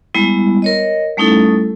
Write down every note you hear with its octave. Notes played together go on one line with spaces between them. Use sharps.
G3 G#3 B3 E4
A#4 C#5 D#5
G3 A3 C#4 D#4 E4 A4